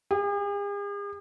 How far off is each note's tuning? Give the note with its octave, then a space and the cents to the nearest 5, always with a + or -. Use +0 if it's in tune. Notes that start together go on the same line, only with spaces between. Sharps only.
G#4 -45